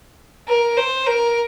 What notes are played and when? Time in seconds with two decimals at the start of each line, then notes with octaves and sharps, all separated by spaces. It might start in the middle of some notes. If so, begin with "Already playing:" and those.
0.48 A#4
0.77 C5
1.07 A#4